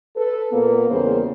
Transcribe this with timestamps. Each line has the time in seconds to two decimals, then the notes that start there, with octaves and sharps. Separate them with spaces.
0.16 A4 B4
0.52 A#2 A#3 B3
0.89 E2 C#3 G3 A#3 C5